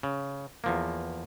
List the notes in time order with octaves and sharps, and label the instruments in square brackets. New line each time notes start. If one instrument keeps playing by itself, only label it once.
[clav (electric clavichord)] C#3
E2 F3 A#3